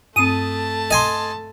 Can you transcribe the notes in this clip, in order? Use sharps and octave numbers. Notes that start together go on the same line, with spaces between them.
G2 A3 C4 A5 D#6
D#5 G#5 C6